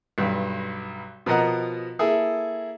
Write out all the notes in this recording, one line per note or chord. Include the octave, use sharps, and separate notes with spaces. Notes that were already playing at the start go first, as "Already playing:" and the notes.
B1 G2
B2 F3 A#4 D#5 F#5 A#5
A#3 E4 G#4 A4